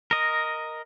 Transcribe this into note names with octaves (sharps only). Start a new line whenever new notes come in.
A#4 D#5